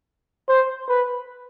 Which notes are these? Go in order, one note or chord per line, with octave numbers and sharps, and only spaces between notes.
C5
B4